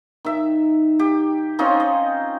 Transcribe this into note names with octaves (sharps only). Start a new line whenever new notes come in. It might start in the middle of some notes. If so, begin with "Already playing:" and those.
D#3 E5
G4
C4 C#4 D#4 F4
D#5